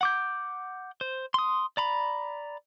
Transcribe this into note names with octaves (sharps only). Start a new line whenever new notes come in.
F#5 D6 G6
C5
C6 D#6
D5 A#5 B5